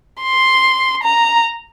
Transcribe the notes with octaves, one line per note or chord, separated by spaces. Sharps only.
C6
A#5